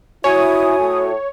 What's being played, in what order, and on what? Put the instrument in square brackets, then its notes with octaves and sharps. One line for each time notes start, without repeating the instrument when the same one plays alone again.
[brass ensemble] E4 [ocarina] F#4 [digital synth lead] C#5 [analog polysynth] G#5 D#6
[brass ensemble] A2